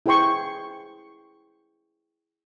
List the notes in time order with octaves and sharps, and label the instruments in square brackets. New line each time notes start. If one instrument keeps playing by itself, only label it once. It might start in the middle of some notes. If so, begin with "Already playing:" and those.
[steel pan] E4 G#4 C5 G5 C6 C#6